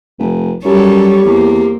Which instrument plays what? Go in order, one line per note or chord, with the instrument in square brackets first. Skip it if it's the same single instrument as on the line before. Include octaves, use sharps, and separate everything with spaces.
[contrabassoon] F1
[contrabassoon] F#2 [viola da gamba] G3 A4 C#5 [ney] G4
[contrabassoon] E2 [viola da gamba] A#3 C4